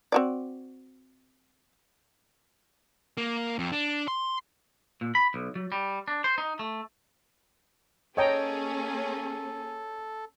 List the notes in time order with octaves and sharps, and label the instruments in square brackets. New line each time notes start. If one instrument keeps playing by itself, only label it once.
[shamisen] C4 F#4 D5
[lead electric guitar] A#3
F2
D4
C6
[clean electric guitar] A#2
B5
B1
F#3
G3
D4
C5
D#4
A3
[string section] A#3 C#4 G#4 [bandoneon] A4 [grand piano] C#5 [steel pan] D#5 G5 A#5